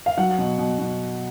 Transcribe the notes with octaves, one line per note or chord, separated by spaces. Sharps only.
F5
F#3 F#5
B2
B2
B2